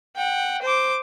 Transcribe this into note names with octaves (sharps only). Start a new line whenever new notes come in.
F#5 G5
C5 D6